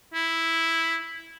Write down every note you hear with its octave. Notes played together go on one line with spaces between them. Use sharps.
E4